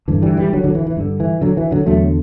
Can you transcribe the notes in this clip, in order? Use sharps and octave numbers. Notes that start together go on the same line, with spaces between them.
G2 D3 E3
E3 G3
E3 G3
D3 F#3
D3 F#3
E3
E3
G2 D3
E3
D3 F#3
E3
D3 F#3
E2 D3 F#3 A3